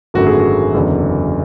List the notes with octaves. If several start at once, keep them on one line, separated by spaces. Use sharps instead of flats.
G#1 F#2 D3 A3 F#4
G#4
F#4
F#1 E2 D3 F#3